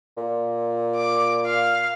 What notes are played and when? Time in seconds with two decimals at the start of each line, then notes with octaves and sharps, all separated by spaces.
0.18 A#2
0.96 D6
1.46 F5